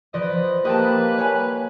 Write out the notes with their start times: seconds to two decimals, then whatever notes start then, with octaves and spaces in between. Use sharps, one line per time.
0.14 F3 B4 D5 D#5
0.65 A#3 G4 B4 D#5 G5 A5
1.18 C#5 G#5